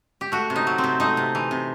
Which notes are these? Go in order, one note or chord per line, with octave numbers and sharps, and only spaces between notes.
G4
A3 F#4
C3
D#4
F#3
C4
C3
A3 D#4
C3
E3
C3